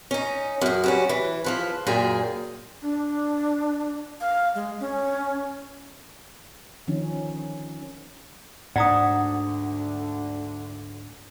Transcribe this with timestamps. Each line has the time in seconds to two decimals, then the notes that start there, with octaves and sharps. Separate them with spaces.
0.11 C#4 D#4
0.61 F#2 G#4
0.84 F#3 G3 C#4
1.09 E3
1.44 C#3 F3 B4
1.87 F#2 A#2 G#4 G5 G#5
2.82 D4
4.20 F5
4.55 G#3
4.80 C#4
6.87 D3 D#3 F3 C#4 D#4
8.76 D2 G#2 D3 D5 F#5 A#5 D#6